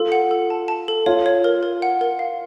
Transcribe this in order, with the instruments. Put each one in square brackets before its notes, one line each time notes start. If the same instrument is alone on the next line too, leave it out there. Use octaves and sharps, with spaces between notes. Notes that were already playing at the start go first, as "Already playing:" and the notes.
Already playing: [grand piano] F4 [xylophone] A4
[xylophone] F#5
A4
A5
A5
A4
[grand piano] F4 [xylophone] C#5
[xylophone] C#5
A#4
A#4
F#5
A#4
F5